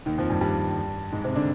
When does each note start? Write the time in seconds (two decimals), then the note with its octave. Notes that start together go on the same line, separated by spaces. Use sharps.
0.06 D#2 D#3
0.18 F2 F3
0.30 G2 G3
0.41 G2 G3
1.12 G#2 G#3
1.24 C3 C4
1.36 D3 D4